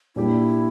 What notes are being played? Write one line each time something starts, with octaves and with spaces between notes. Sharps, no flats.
A#2 G3 D4 E4 G4